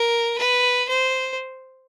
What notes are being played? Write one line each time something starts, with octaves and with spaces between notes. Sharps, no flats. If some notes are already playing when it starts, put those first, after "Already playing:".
Already playing: A#4
B4
C5